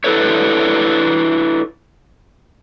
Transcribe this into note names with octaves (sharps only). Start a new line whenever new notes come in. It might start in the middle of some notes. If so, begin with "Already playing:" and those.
D4 E4 A4 B4 C#5